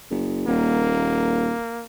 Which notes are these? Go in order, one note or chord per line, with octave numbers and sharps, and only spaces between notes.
F#1
D#1 A#3